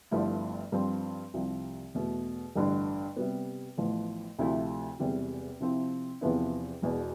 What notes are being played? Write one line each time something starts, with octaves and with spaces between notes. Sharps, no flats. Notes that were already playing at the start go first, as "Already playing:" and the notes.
G1 G2 F3 A3 E4
G2 F3 C4
C2 C3 F3
E2 B2 A3
A1 G2 D3
C3 G3 B3
A1 A2 F3 B3
D2 C3 F3 A3 E4
E1 E2 C3 G3
C3 F3 C4 E4
E2 C3 F3 B3 E4
E1 E2 B2